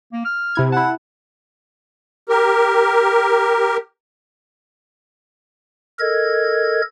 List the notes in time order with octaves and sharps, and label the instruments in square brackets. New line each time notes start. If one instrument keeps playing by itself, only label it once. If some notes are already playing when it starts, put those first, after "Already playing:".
[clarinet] A#3
F6
[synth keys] C3 E4 G#6
[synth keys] E4 A5 [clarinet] F#5
[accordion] G4 A#4
[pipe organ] A4 A#4 D#5 G#6